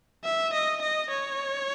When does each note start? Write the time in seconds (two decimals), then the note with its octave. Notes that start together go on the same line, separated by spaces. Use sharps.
0.25 E5
0.53 D#5
0.82 D#5
1.10 C#5